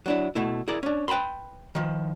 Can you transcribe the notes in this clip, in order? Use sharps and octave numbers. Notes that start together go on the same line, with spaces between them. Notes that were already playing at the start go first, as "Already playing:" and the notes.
F#3 D4 E4
B2 A3 E4
E4 G#4 A#4 D5
C#4 D4
B4 G5 A5 B5 C6
D#3 F3